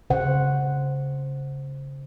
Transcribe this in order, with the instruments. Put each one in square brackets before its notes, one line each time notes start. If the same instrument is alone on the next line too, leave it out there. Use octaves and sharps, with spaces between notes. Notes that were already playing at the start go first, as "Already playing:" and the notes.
[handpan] C#3 C5 F#5